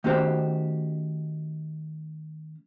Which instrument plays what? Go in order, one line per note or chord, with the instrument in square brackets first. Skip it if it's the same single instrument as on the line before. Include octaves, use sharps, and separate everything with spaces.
[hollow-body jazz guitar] D#3 A3 C#4 F#4 G4 C5